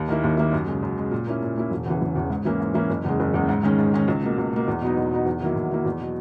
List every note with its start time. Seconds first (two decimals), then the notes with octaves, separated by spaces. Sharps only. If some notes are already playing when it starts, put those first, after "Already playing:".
Already playing: D#2
0.09 D#3 A#3 E4
0.24 D#2
0.37 D#3 A#3 E4
0.53 F#2
0.67 C#3 G#3
0.83 F#2
0.98 C#3 G#3
1.11 A#2
1.27 A#3 C#4 E4
1.42 A#2
1.56 A#3 C#4 E4
1.71 E1
1.85 E2 C#3 E3
2.01 E1
2.15 E2 C#3 E3
2.30 G#2
2.45 E3 A#3 C#4 E4
2.60 G#2
2.74 E3 A#3 C#4 E4
2.90 F#1
3.05 E2 C#3 G#3
3.20 F#1
3.34 E2 C#3 G#3
3.49 G#2
3.63 D#3 G#3 C#4
3.79 G#2
3.94 D#3 G#3 C#4
4.08 C#2
4.23 B2 A#3
4.38 C#2
4.53 B2 A#3
4.68 E2
4.81 B2 F#3 B3 D#4
4.97 E2
5.11 B2 F#3 B3 D#4
5.26 E2
5.41 D#3 F#3 A#3 E4
5.56 E2
5.71 D#3 F#3 A#3 E4
5.86 E2
6.00 B2 F#3